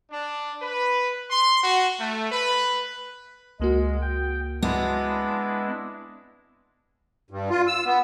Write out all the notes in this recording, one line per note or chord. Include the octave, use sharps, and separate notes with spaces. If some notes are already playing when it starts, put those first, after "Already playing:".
D4
B4
C6
F#4
A3
B4
C#2 G#3 A#3 F#4
G5
G#3 B3 D4 E4
G2
F4
E6
B3